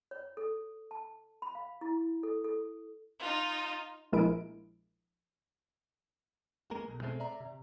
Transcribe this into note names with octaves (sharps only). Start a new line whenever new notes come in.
C#5
A4
A5
B5
F5
E4
A4
A4
D#4 F4
A#1 F3 G#3 E4 A#4 D7
G#3 A#3 A#4
B1
B2 G#3 A3 C4
D5 E5 A#5
C3